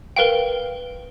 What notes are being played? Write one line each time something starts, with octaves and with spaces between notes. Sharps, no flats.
A#4 B4 F5 G5